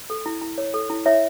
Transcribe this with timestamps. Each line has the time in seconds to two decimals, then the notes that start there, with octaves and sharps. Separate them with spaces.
0.10 A4
0.26 E4
0.41 E4
0.58 C#5
0.74 A4
0.90 E4
1.06 E4 C#5 E5